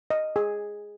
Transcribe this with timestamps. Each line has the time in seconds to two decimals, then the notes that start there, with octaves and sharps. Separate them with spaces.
0.10 D#5
0.36 G#4